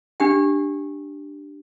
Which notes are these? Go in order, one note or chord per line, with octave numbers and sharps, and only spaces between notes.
D4 G4 G5